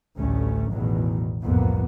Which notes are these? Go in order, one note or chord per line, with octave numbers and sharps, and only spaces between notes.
A1 D2 G3 A3 C#4
A1 E2 B2 D#3 F#3
G1 C2 F2 A2 A#3 B3